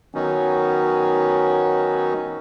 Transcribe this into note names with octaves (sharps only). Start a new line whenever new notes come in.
D#3 F#3 B3 C#4 D#4 F#4